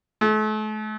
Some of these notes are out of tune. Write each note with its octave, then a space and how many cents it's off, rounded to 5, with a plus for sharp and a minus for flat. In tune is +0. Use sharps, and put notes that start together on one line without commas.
A3 -40